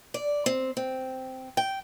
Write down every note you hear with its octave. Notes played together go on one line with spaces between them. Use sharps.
D5
C4
C4
G5